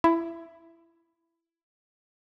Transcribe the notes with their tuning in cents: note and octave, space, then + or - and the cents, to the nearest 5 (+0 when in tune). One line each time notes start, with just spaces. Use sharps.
E4 +20